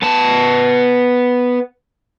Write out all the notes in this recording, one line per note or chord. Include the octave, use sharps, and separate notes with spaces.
B3 A5